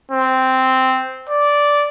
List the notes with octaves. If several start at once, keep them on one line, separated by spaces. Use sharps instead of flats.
C4
D5